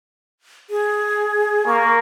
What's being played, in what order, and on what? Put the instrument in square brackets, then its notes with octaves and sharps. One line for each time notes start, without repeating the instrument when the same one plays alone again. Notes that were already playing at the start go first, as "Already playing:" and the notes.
[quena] G#4
[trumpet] A#3 [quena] C#6